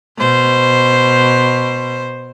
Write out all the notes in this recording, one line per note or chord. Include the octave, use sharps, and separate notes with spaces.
B2 C5